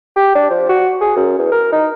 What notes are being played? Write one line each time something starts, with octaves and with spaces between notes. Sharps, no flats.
G4
D4
F3
F#4
G#4
F#2
E2
A#4
D#4